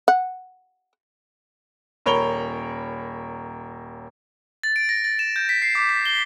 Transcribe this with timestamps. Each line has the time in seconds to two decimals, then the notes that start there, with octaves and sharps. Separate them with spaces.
0.08 F#5
2.06 D#1 A#4 C#5 B5 F7 G7
4.63 A6
4.76 D7
4.89 A#6
5.04 A6
5.19 E7
5.36 G6
5.49 B6
5.62 C7
5.75 D6
5.89 B6
6.06 G7